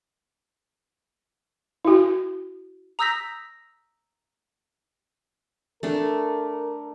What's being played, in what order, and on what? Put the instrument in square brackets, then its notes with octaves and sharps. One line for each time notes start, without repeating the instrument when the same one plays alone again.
[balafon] E4 F#4
[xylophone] A#5 D#6 E6 G6 A#6 B6
[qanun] A3 D4 [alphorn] A#4